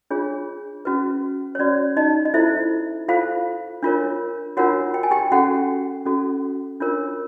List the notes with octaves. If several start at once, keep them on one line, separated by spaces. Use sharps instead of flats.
D4 F4 G#4 C#5
C#4 F#4 B4
C#5
C#4 F#4 B4 D5
D#4 D#5
D#5
E4 F4 A4 C5 E5
F4 A4 C5 F5
D4 F4 A#4 C#5
D4 F4 F#4 A#4 C#5 F#5
G5
G#5
G4 G5
C#4 F#4 A4 F#5
C#4 F#4 A4
D4 F4 A#4 C#5